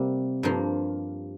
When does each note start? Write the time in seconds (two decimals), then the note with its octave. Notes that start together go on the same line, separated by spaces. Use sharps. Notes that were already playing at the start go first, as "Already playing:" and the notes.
Already playing: C3 G3 A#3
0.43 G2 F3 A#3